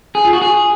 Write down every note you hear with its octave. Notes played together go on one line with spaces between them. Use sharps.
G#4
F4
F#4
G#4